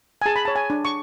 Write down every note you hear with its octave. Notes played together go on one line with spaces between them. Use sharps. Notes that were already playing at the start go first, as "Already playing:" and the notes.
G#5
G#4 A5
B5
C#5 A5
G#5
D4
C#6